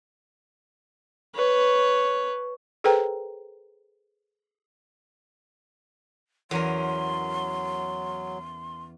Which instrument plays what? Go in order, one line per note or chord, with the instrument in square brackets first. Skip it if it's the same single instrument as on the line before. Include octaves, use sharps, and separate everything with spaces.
[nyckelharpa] B4 C#5
[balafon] G#4 A4 B4 C5 G5 A#5
[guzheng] E2 C#4 A#4 [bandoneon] F#3 [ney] C6